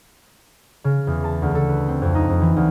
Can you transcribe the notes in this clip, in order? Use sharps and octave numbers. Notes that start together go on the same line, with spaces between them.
C#3
E2
A5
D2
A4
B4
C4
F2
D#4
F2
E3
D2